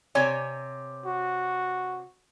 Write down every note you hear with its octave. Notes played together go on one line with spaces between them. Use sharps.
C3 C#5 G#5
F#4